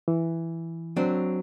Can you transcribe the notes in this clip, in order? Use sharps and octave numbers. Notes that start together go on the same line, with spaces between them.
E3
F#3 C4 D4